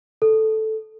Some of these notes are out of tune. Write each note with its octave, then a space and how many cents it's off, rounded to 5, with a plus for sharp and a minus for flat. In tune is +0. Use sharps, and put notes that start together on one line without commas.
A4 -5